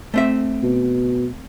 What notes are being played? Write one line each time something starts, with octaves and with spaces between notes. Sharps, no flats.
A3 C4 E5
B2